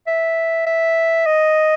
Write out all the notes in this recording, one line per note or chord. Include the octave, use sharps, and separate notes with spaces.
E5
E5
D#5